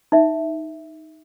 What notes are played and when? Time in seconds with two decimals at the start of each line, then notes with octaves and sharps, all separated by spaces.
0.12 D#4 E5